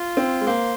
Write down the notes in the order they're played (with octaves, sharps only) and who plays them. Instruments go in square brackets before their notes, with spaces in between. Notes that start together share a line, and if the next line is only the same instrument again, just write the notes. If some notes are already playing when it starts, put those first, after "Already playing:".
Already playing: [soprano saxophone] F4
[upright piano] C4
G#3
[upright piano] A#3 [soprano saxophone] C5